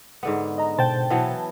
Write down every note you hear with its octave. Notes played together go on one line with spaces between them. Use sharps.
G#2 D3 B3
D#5 A#5
B2 C5 G5 A5
E3 F#3 B3